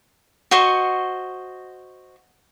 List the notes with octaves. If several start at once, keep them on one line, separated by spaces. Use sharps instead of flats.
F#4 C5 D#5 C#6